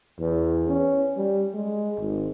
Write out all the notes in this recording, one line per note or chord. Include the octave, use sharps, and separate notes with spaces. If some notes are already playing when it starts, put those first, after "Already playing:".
E2
C#4
G3
G#3
G#1